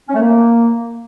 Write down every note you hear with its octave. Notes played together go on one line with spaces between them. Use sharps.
C#4
A3
A#3